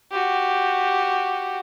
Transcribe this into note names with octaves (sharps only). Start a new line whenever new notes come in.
F#4 G4